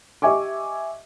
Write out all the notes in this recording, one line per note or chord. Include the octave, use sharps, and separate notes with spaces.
G4 D#5 E5 G#5 C#6 D6